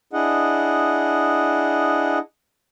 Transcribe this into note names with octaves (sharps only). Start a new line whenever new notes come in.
D4 E4 G#4 D#5 F#5